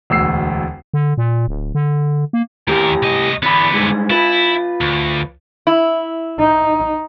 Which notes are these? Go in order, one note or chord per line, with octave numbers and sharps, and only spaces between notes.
E1 D2 E6 C7
D3
A#2
D1
D3
A#3
D#2 A2 G4 A#4
C2 D#5
E2 D3 B3 B5
G2 G#3
E4 F4 B4
D2
E4
D#4